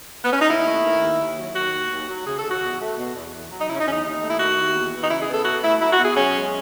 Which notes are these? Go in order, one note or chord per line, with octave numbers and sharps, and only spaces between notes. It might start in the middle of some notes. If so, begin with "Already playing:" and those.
B3
C#4
D#4
D#2 E4
A3
D#3
D#2
D#2
F#3
D#3 F#4
D#2
D#2
F#3
C#3 G#4
A4
D#2
F#4
E2
A3
B2
E2
E2
F#3
D#4
C#3 E4
C#4
D#4
E2 C#4
D#4
D#2 D#4
A3
E4
D#3 F#4
D#2
E2
E3
D#4
C#3 E4
G#4
B3
A4
B2 F#4
A3 E4
F#3 E4
F#4
B2
G#4
F#2 C#4
G#3